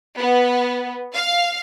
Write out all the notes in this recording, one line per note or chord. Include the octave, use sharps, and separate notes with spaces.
B3
F5